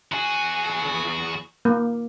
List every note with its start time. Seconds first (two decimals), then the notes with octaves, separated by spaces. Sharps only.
0.12 E2 F#4 G#4
1.65 A#3